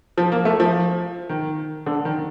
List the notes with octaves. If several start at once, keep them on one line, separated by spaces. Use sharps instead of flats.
F3
A#3
A3
F3
D#3
D3
D#3